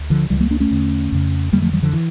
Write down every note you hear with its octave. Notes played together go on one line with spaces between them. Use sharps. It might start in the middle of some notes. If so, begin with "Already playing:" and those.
Already playing: D2
D3 F3
C#2 C#3 E3 G3
G3 A#3
A#3 D4
A3 C#4
E2 D3
F2 C#3
F2 D3 G3 A#3
F3 A3
E3 G3
D3 F3
E3